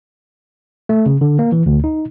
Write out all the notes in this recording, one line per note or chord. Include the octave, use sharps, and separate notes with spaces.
A3
C#3
D3
A#3
E3
D2
D#4